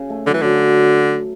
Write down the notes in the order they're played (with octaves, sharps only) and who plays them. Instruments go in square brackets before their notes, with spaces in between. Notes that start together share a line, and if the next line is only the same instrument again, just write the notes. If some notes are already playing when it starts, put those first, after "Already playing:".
Already playing: [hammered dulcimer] C#3
A3
[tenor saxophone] D3 [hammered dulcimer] F#3
[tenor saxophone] E3
[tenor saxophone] D3 [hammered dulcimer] F#3